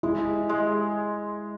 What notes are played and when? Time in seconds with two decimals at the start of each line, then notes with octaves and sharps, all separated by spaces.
0.03 G#3 E4
0.49 G#3